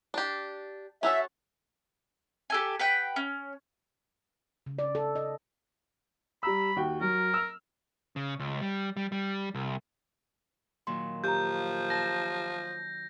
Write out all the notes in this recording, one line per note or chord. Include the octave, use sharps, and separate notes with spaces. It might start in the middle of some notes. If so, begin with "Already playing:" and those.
D4 G4
C#4 F#4 A4 E5
G4 A4 G#5
B4 F#5 G5
C#4
C#3
D5
A4
D#5
G3 A#5 B5 E6
D#2 F#4 G5
F#3 A#4
E6 F6
C#3
C#2
G3
G3
G3
C2
A#2 D#3 F#3 C6
F3 G4 A#5 G6
A5 A#6